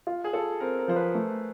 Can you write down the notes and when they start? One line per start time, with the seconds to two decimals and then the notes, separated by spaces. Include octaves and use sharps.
0.07 F4
0.24 G#4
0.33 F4 A4
0.60 C4 A#4
0.79 A#4
0.88 F3 C5
0.96 B4
1.15 A3